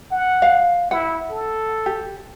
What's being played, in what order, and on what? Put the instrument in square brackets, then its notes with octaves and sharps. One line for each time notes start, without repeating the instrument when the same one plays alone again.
[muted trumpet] F#5
[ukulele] F5
[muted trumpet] E4 [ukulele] F#5
[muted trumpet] A4
[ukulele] G4